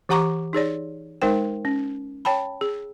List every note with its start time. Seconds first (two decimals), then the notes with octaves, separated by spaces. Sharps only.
0.09 E3 G4 F#5 A#5 C#6 D6
0.53 D#4 G#4 C#5 D5
1.22 G#3 D#4 A#4 C5 G5
1.65 C#4
2.25 C#5 G5 A5 B5
2.61 G#4